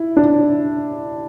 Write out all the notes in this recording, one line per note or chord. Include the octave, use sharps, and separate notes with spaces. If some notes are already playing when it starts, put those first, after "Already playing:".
Already playing: E4
D4